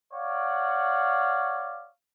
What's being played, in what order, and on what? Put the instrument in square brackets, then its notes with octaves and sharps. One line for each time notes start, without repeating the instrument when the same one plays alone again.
[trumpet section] C#5 D5 F5 F#5